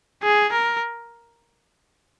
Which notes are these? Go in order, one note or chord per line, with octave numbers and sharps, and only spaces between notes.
G#4
A#4